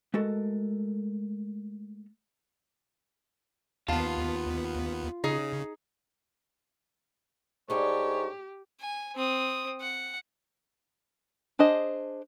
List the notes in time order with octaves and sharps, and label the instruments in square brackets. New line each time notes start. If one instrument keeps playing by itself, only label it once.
[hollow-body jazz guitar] G#3 A3 F#4 A4 A#4
[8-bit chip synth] D#2 B3 [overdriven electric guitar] F4 [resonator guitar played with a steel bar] F5 A5
[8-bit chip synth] C#3 [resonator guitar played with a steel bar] D#4 G#4
[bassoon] G#2 [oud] D4 A4 [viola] G4 [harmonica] C#5
[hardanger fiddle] G#5
C4 D#6
F#5
[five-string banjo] D4 G#4 C5 D#5